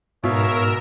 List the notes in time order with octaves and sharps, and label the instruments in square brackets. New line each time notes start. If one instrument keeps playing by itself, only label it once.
[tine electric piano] G#2 [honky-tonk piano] B2 [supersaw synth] A#4 E6 [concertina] C#5 E5 F5